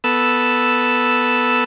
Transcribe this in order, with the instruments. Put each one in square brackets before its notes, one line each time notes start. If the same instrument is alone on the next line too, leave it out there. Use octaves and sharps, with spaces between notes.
[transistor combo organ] B3 A4 E6